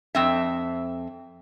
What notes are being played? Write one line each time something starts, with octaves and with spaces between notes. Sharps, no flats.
F2 C4 E5